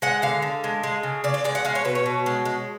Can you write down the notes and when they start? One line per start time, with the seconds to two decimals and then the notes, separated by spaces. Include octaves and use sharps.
0.02 G#3 F#5
0.22 D3 F5
0.42 D3
0.64 G#3
0.83 G#3
1.03 C#3
1.24 C#3 D5
1.34 D5
1.44 G#3 D5
1.55 F#5
1.65 G#3 F5
1.75 C#5
1.85 B2 B4
1.95 C#5
2.06 B2
2.26 G#3
2.45 G#3